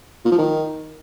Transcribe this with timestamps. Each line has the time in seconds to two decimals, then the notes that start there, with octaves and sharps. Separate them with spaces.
0.25 A#2
0.32 F3
0.38 D#3